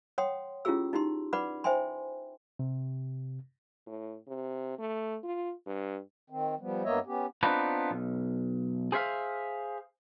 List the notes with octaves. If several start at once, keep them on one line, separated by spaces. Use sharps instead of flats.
C#5 F#5 G5 C6 D#6
C#4 E4 F4 G4 G#4 E6
D#4 E4 G4 C6
B4 D5 F#5 B5 D6
C5 E5 G5 G#5 C6
C3
A2
C3
A3
F4
G2
D#3 C4
F3 G3 B3
G2 A#3 B3 C#5 D#5 E5
B3 C#4 G4
B3 C4 D4 D#4 F4 B4
B1
G#4 C5 C#5 E5 F5